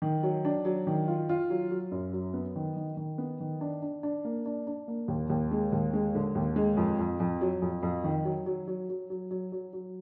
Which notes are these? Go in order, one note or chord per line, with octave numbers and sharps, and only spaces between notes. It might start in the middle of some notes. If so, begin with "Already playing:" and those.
D#3
F#3
D4
F#3
D#3
F4
F4
F#3
F#3
F#2
F#3
B3
D#3
D#3
D#3
B3
D#3
D4
D4
D4
A#3
D4
D4
A#3
D#2
D#2
G#3
D#2
G#3
D3
D#2
G#3
F2
F2
F2
F#3
F2
F2
D#3
F#3
F#3
F#3
F#3
F#3
F#3
F#3
F#3